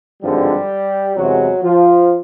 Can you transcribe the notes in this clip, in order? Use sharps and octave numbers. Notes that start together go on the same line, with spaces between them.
G#1 G2 D3 F3 G3 G#3 G4
E2 C3 E3 F#3 G#3 F#4
F3 F4